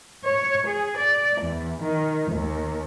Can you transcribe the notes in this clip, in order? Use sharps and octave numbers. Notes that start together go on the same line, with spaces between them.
C#5
G#4
D5
E2
D#3
D#2